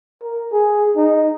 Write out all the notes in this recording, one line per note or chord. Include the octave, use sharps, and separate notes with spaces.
A#4
G#4
D#4